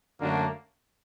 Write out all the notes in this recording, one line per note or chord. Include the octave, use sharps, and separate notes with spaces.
F#2 D3 A3 A#3 D4 F#4